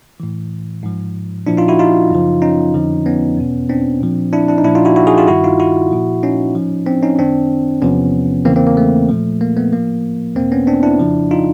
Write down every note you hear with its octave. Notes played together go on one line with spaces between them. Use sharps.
A2 E3
G#2 F3
A#2 F3 D4 E4
D#4 F4
E4 F#4
D#4 F4
F#2 C#3 F3
C#4 D#4
F2 D3 F3
B3 C#4
E2 B2
C4 D4
A#2 F3
D4 E4
D4 E4
D#4
A#2 F3 D4 E4
D#4 F4
E4 F#4
E4 F#4
F#4 G#4
F4 G4
G2 D#3 E4 F#4
D#4 F4
E4 F#4
A#2 F3
C#4 D#4
A2 F3
C4 D4
C#4 D#4
F#2 D#3 C4 D4
E2 C3 F3 B3 C#4
E2 C#3 E3 A#3 C4
A#3 C4
A#3
A3
A#2 F3
A#3
A3 B3
A2 F3 A#3
E2 B2 A#3 C4
B3 C#4
C4 D4
D4 E4
F2 C#3 F3
D#4 F4